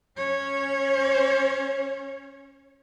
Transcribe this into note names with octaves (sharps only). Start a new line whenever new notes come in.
C#4 C#5